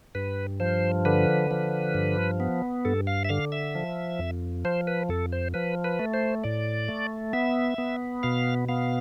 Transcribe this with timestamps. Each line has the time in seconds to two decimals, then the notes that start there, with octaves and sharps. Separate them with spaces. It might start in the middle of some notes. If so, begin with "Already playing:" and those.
0.15 G2 B4
0.60 F3 C5
1.05 D3 B4
1.51 F3
1.94 G2
2.40 B3
2.85 G2 A4
3.07 F5
3.25 E5
3.29 D3 F5
3.52 E5
3.75 F3
4.19 F2
4.65 F3 C5
4.87 B4
5.09 F2 A4
5.32 C5
5.54 F3 B4
5.84 B4
5.99 A3
6.14 C5
6.44 A2 D5
6.88 A3
7.33 B3 E5
7.78 B3
8.23 B2 F5
8.69 B3 F5